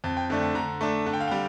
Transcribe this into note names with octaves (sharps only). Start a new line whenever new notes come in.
F2 A5
G5
D3 A3 D4 A5
A5
D3 A#5
A3 D4 A5
D3 A5
G5
F5
G3 G5